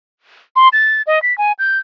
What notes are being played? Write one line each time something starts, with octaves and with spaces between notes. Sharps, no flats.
C6
A6
D#5
B6
G#5
G6